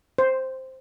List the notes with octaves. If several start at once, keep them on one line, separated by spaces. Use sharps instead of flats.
C5